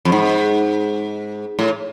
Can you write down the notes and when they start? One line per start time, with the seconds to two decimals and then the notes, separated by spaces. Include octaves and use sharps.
0.05 F2
0.12 G#2
1.59 A2